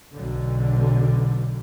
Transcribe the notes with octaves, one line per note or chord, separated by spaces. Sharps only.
B1 D3